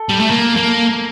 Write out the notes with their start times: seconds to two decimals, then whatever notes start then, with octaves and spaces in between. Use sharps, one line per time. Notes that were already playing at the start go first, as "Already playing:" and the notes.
Already playing: A4
0.09 G3
0.20 A3
0.31 A#3
0.57 A#3